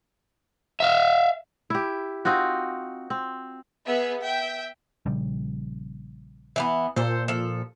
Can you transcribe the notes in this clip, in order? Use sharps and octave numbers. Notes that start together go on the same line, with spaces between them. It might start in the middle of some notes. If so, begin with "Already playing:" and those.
E5 F5
E4 G4
C4 D#4 F4 F#4
C4
B3 G#4 E5
E5 G5
A#1 C#3 G3
E3 A#3 B3
A#2 A4 C5
F3 A4